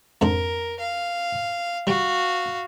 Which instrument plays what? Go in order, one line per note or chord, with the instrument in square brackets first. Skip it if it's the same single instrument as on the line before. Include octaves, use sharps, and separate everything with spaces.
[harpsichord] F2 G#2 D4 [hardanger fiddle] A#4
[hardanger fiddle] F5
[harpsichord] G3 [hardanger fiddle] F#4 F5